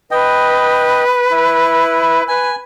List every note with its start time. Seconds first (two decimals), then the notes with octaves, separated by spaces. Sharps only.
0.11 B4 D#5 G5
1.31 E4
2.28 B4 G#5